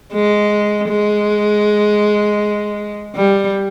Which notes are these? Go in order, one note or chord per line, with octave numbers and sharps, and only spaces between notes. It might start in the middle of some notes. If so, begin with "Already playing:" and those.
G#3
G#3
G3